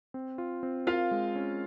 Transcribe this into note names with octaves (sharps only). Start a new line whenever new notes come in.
C4
F4
C4
F4 A#4 F5
G#3
C#4